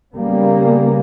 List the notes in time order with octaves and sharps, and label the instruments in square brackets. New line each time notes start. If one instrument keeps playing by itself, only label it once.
[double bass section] C#3 G3 A#3 B3